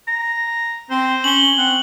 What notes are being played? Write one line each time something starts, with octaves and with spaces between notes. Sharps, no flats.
A#5
C4 C5
C#4 F#7 G7
C4 F#5